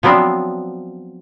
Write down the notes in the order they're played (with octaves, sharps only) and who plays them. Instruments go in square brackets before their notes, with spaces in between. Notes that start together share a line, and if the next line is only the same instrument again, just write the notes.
[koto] F3 F#3 B3 C4 D4